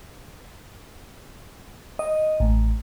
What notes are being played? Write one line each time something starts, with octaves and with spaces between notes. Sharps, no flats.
D#5
A1